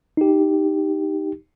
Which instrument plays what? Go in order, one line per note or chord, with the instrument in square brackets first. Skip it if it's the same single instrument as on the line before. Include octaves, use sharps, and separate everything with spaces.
[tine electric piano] D#4 G4